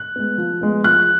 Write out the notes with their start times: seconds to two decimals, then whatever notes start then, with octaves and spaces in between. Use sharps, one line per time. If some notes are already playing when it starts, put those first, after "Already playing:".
Already playing: F#6
0.16 G#3 B3
0.38 F3
0.61 G#3 B3
0.84 F3 F#6